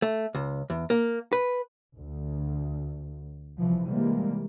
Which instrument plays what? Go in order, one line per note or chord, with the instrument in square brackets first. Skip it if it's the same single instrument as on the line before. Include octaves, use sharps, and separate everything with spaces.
[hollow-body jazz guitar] A3
C#2
E2
A#3
B4
[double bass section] D2
C2 E3 F3
C3 E3 G3 G#3 A#3